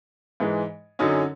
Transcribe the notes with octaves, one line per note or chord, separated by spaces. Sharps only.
G#2 E3 G#3
F#2 D3 F#3 C#4 D#4